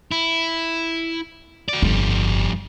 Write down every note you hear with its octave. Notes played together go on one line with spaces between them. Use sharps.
E4
F#4 D5
G1 F2 G3